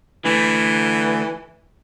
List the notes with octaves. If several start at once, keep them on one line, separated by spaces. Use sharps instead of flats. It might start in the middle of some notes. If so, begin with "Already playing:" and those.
D3 E3 A3